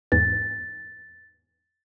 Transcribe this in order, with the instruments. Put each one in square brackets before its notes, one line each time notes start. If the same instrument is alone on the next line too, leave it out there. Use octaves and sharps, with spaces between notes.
[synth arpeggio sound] E2 G#2 E3 [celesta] A6